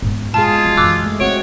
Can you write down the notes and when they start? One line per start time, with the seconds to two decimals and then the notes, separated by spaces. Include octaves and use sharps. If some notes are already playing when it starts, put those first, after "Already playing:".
0.02 G#2 B3
0.34 B2 G#3 F4 G#4 A5
0.64 F3
0.77 F#2 E3 D6 E6 F#6
1.03 G#3 A3
1.20 C4 E4 F#4 C#5 F#5 D7